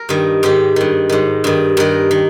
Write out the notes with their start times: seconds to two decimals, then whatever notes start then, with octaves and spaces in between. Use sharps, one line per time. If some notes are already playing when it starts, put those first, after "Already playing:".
Already playing: A#4
0.09 G2 D#3
0.43 G#2 D#3 G4
0.76 G2 D#3
1.09 G#2 D#3
1.44 G2 D#3
1.77 G2 D#3 A#4
2.11 D#3